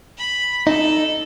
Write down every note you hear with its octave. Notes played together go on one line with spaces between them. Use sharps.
B5
D#4 A4